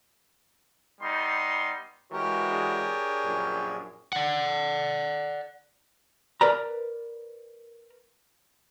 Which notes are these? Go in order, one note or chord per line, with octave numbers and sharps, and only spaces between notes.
G3 B3 D#4 C6
E3 G#3 F#4 G4 A#4 C#5
D4 G#4
A#1 F#2 A#2
D5 F#5
A#4 B4 D5 A#5